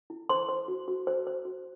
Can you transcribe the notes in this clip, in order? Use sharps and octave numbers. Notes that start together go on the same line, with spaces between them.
E4
C5 C6
C5
F#4
F#4
C5
C5
F#4